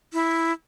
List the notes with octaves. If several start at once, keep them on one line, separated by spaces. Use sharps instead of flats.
E4